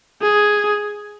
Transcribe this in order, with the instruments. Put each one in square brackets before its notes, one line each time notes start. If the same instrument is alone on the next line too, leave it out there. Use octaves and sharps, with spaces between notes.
[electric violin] G#4